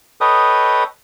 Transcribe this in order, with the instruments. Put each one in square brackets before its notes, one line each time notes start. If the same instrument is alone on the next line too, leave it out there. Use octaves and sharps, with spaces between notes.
[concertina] A4 B4 C#5 D#5 G5 D#6